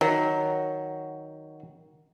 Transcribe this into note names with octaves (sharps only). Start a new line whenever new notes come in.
D#3 F#3